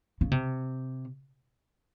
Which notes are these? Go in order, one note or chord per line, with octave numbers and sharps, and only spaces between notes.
C#3
C3